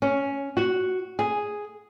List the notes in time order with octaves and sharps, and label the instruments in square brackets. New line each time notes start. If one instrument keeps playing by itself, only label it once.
[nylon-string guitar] C#4
F#4
G#4